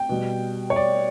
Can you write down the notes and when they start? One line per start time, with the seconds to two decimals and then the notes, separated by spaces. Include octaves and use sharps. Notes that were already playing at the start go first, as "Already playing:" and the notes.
Already playing: G5
0.09 B2 G3
0.70 C#5
0.76 D5